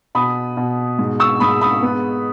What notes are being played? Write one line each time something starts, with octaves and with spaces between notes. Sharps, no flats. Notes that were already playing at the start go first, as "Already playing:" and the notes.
B2 B5 D#6
B2
G#2
C#6 E6
G#2 B5 D#6
B5 D#6
B3